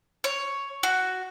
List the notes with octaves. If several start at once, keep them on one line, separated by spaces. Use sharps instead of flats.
C#5
F#4